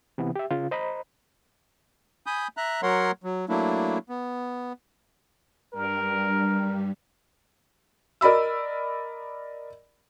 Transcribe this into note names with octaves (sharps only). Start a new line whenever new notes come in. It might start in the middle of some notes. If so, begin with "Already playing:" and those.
C3 E3 B3
G4 E5
C#3 F4
C5 D#5 A#5 B5
G#5 B5 D#6 G6
E5 A#5 F#6
F#3 A#4 C#5 F#5 C6
F#3
F#3 A3 A#3 D4 E4
B3
G2 G3 A#4
A#4 D5 D#5 B5 E6